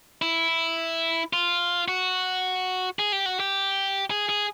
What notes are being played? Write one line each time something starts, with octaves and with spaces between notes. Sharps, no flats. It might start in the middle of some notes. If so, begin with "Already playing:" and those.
E4
F4
F#4
G#4
G4
F#4
G4
G#4
G#4